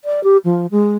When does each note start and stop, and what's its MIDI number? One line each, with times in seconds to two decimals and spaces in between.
0.04 0.23 74
0.24 0.37 67
0.44 0.66 53
0.71 0.97 56